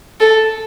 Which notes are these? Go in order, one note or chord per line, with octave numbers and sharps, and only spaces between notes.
A4